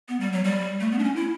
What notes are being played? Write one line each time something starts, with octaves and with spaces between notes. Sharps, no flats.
B3
G3
F#3
G3
A3
B3
D4
C#4
E4